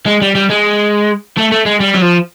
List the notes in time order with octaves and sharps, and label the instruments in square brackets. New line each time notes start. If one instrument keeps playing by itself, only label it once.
[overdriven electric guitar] G#3
G3
G3
G#3
A3
A3
G#3
G3
F#3
F3